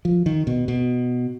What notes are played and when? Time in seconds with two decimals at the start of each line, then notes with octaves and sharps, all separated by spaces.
0.05 F3
0.26 D#3
0.47 B2
0.68 B2